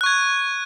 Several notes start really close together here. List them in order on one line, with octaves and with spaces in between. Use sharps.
F#6 C#6 G#6